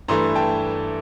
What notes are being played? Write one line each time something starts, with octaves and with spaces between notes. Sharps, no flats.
G2 E3 A3 A#5 C6
G5 A5